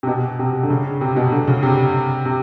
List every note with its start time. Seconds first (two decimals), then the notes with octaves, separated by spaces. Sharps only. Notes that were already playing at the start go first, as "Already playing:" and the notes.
0.03 C3
0.07 B2
0.39 C3
0.63 D3
0.70 C#3
1.01 C3
1.16 B2
1.32 D3
1.47 C#3
1.63 C3
2.25 C3